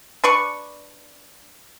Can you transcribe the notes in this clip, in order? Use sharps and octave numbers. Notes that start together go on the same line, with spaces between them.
D4 B4 D5 C#6